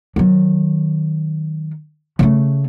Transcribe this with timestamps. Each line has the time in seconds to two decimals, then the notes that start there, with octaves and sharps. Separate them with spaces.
0.16 D#3 F#3
2.19 C#3 A3